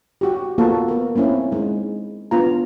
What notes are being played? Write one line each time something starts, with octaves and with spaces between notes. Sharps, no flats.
F#4 G4
A#3 B3 F4 F#4 A4 A5
B3 A#4
A#3 C4 C#4 E4
G#3 D#4
B3 D4 F4 A#5